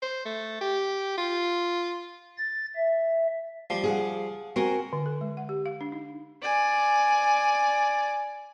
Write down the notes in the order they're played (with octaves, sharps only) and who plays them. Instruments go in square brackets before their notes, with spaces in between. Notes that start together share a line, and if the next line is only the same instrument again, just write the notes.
[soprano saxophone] C5
A3
G4
F4
[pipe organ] A6
E5
[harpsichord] F3 G3
[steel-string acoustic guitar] G#4 F5 F#5
[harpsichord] C4 [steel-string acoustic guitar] F#4 A#4 G#5
[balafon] D3
A4
G#3
F#5
G4
F5
D4
D#4
[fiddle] D5 G#5